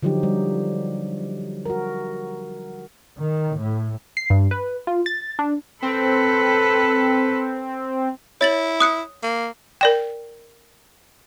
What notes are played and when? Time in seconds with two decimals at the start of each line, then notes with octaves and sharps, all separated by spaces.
0.03 D3 F3 F#3 D#4 G4
0.23 G3
1.66 F#4 A#4
3.17 D#3
3.56 A2
4.17 C7
4.30 G2
4.51 B4
4.87 F4
5.06 A6
5.39 D4
5.82 C4 A4 B4
8.41 E4 C#5 A6 F#7
8.80 D#6 F#6 C#7
9.23 A#3
9.81 A#4 D5 G5